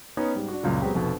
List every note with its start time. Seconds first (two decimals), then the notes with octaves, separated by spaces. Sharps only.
0.17 B3 C#4 D#4
0.36 G#2 G3
0.48 D4 F#4
0.63 C#2 F#2 A#2 C#3
0.82 F#3 G#3 B3 C4 G4
0.94 F1 F2 B2